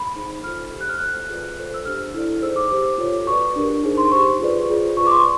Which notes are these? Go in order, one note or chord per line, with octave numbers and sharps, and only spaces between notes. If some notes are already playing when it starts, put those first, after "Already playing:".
Already playing: B5
D#4 G#4 C5
F4 A4 C5 F6
G4
C5 F#6
F6
F#4 A4 C5 F#6
F4 G#4 B4 D5
F4 A4 C5
E6
D4 G4 C5 F6
E4 A4 D5
D#4 G#4 C5 E6
D6
G4 C5
F4 A4 C#5
F#4 B4 D5 C#6
D4 G4 A#4
D#4 G#4 C5
C6
G4 C5 C#6
F4 G#4 B4 D5
F4 G#4 C5
F4 G#4 B4 D5 C#6
D6
C6
C#6